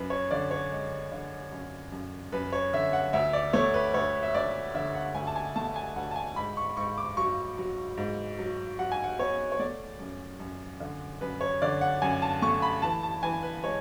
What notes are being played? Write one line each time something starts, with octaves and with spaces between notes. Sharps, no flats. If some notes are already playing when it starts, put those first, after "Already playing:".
Already playing: F#2 B4
C#5
D3 D5
C#5
G#3
D3
F#2
F#2
F#2 B4
C#5
D3 E5
F#5
D2 E5
D5
A3 C#5
B4
D2 C#5
E5
D2 D5
D3 E5
F#5
D2 G#5
A5
G#5
A3 A5
G#5
D2 F#5
A5
G#5
G#2 B5
C#6
G#2 C#6
D6
F#3 C#6
F#3
G#2
F#3
F#3 F#5
G#5
F#5
B3 C#5
C#5
A3 D5
F#2
F#2
D3
F#2 B4
C#5
D3 D5
F#5
F#2 G#5
A5
A3 C#6
B5
E3 A5
A5
E3 G#5
B4
G#3 C#5